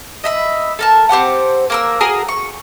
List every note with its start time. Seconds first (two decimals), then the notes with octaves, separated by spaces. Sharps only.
0.24 D#5 E5 B5
0.79 A4 A#4 A5
1.09 C4 G4 C5 F#5
1.70 A#3 A#4 E6
2.01 F#4 G#4 A#4
2.29 C#6